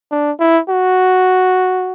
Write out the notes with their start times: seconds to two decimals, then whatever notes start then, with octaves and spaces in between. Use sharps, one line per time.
0.12 D4
0.40 E4
0.69 F#4